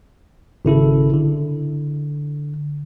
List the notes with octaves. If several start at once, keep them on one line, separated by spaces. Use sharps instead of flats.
G#1 C#3 E4 A4
D3